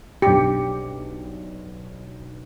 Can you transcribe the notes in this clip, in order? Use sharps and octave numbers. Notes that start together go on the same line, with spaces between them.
B1 D4 G4 C#7